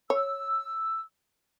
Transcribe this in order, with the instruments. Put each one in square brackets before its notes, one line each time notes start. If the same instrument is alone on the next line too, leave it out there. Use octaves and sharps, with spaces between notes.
[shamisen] C#5 [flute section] E6